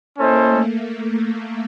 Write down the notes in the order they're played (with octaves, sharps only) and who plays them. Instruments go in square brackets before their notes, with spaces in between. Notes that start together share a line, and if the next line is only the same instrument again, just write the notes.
[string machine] A#3 [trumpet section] C#4 E4 A4 C5 D#5
[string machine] A3